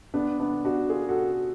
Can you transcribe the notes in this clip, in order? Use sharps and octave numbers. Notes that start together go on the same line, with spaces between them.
B3 D4
B3 D4
D4 F#4
F4 G#4
F#4 A4